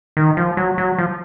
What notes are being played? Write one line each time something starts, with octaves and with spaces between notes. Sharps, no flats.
D#3
F3
F#3
F#3
F3